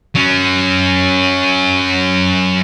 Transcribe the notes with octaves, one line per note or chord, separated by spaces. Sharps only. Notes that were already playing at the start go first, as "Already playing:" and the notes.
F#3 C#4